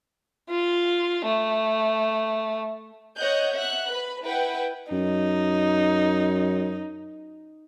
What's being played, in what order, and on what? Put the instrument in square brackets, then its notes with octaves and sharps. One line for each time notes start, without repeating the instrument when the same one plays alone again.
[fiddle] F4
A3
[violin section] C#5 D#5 F#5 F#6 G6
E5 F#5 F#6
B4 B5
E4 B4 F#5 G5
[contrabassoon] F#2 [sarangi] D#4